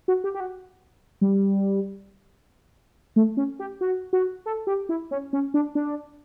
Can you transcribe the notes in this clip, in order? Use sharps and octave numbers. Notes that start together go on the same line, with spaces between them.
F#4
G4
G4
F#4
G3
A3
C#4
G4
F#4
F#4
A4
G4
E4
C#4
C#4
D4
D4